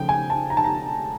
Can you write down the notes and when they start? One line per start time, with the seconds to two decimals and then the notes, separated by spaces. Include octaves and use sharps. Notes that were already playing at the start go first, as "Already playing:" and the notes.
Already playing: C#3 F3 A3 G5
0.09 G#5
0.30 A5
0.50 A#5
0.57 A5
0.64 A#5